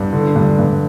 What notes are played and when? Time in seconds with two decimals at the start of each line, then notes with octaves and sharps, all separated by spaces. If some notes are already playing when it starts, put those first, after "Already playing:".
Already playing: G2
0.13 D3
0.36 G2
0.59 G2